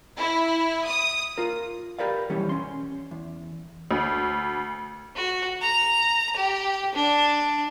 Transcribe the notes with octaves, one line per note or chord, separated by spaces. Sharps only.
E4
D#6
F4 A#4
G4 A#4 B4 D5 F5
B1 F2 E3 G3 C#4 G4
C#4 C6
E2
D2
F#4
A#5
G4
D4